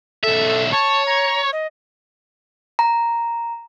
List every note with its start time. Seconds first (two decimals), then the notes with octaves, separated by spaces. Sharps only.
0.23 B1 A4 E5
0.72 C#5 A5
1.06 A#5
1.53 D#5
2.79 A#5